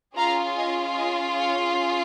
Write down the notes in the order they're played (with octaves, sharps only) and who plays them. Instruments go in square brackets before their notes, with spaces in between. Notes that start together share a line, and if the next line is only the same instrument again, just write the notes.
[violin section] C#4 F4 G#4 F5 A#5
D#5 G#5
D#5 G#5
C#5 F5